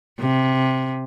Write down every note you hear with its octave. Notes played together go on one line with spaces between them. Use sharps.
C3